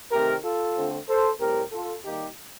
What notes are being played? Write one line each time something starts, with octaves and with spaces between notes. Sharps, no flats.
C3 D#3 A3 C4 G4 A#4
F4 A4
D3 A3 C4
A4 C5
A2 G3 C4 G4 A#4
F4 A4
D#3 G3 A#3 D#4 G4